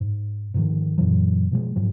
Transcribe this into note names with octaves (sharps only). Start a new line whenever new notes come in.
G#2
G#2 D3 D#3 F3
F#2 A#2 E3 F#3
B2 F3 G#3
G#2 F3 F#3